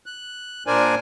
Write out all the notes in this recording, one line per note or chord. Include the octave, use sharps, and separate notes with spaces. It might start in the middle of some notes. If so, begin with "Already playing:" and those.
F#6
A#2 D4 A#4 C5 D5 G#5